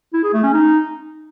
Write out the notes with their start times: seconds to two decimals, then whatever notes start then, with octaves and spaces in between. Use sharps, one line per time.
0.13 E4
0.23 G#4
0.33 A3
0.43 C#4
0.53 D#4